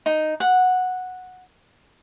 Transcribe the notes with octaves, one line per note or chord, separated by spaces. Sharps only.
D#4
F#5